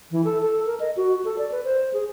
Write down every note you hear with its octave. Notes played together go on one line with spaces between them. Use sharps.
E3
A4
A4
A#4
D#5
F#4
A4
D5
B4
C5
G#4